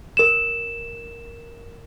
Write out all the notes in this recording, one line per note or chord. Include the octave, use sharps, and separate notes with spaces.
A#4 E7